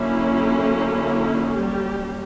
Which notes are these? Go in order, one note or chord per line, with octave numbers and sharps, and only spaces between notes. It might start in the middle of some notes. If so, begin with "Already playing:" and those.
Already playing: D3 F#3 A#3 C#4 E4
E4
G3 G4